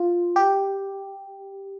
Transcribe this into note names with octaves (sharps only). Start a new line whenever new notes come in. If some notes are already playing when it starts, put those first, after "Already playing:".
Already playing: F4
G4